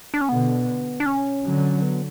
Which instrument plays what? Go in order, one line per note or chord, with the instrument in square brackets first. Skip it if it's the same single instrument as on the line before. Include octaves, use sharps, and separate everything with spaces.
[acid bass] D4
C#4
[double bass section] B2 D3 [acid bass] B3
[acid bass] D4
C#4
[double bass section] D3 F#3
[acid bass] B3